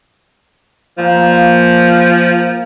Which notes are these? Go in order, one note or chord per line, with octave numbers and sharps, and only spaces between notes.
A#2 F3 A#3